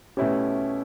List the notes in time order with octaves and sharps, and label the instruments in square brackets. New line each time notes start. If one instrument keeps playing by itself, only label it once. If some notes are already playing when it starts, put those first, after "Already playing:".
[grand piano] B2 A3 E4 G4 [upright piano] C#4